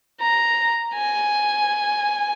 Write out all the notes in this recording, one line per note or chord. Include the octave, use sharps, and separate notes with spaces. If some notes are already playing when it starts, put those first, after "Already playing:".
A#5
G#5